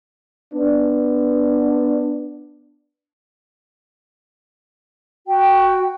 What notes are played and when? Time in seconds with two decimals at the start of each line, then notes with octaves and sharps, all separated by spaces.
0.54 B3 D4
5.27 F#4 G5